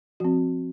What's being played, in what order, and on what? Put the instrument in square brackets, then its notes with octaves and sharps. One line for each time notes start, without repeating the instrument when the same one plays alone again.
[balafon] F3 C4 F#4